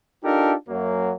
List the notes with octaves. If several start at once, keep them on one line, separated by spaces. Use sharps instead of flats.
D4 D#4 F4 G4 A4 A#4
F#2 F#3 A#3